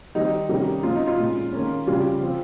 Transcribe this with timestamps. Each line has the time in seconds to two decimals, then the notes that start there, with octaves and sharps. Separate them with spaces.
0.15 D#3 G3 C4 D#4
0.49 C3 D#3 G3 A#3 C#4
0.83 F3 G#3 C#4 F4
0.95 D#4
1.07 F4
1.18 A#2 G#3 C#4
1.52 D#3 A#3 C#4
1.87 C#3 G3 C#4 F4
2.21 F3 C4